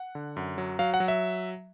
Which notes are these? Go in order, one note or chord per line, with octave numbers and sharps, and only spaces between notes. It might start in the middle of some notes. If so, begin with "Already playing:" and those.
Already playing: F#5
D3
F#2
F#3
F#3 F5
F#5
F#3
E5